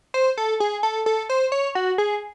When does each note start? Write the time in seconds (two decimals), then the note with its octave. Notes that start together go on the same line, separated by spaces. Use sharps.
0.14 C5
0.38 A4
0.60 G#4
0.83 A4
1.06 A4
1.29 C5
1.52 C#5
1.75 F#4
1.98 G#4